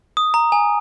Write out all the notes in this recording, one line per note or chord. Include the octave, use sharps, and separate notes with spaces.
D#6
A#5
G#5